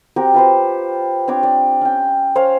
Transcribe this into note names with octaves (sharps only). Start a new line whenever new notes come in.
C4 F#4 G4 A#4
F4 B4 C5
C4 D4 C#5 D6
D5
C#4 G5
C#4 C5 C#5 F5